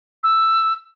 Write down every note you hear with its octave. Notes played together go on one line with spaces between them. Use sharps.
E6